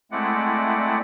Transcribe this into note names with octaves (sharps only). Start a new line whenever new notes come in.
G#3 A3 C4 E4 D5 F#5